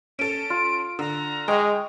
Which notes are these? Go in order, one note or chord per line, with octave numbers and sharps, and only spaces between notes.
C#4 A4 D7
F4
D3 A#5
G#3 D#5 G5 C#6